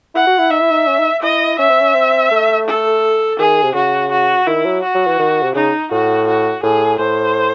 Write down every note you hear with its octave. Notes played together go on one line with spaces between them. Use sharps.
E4 F#5
F#4
E4
D#4 E5
E4
D#4
C#4
D#4
E4 D#5
C#4 E5
C4
C#4
C4
A3
A4
D#3 G#4
C3
C#3 F#4
F#4
D#3 E4
F#3
F#4
F#3
E3
D#3
C3
C#3 D#4
A2 F#4
F#4
A2 G#4
A2 C5